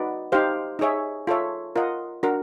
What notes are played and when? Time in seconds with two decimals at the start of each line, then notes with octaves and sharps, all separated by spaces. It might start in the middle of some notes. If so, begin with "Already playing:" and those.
Already playing: D#4 F#4 B4 D5
0.32 D#4 G4 C5 F5
0.79 D#4 G#4 C#5 E5
1.27 F4 A4 C#5 E5
1.76 F4 A#4 D#5 F#5
2.23 D4 F#4 A#4